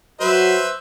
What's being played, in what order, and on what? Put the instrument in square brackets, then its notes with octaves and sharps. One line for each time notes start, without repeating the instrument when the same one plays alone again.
[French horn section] F#3 F#4 [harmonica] B4 C5 E5